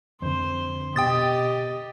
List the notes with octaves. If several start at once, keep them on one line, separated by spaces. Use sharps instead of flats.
F2 D3 C5
B2 G4 D#5 G5 D#6 A6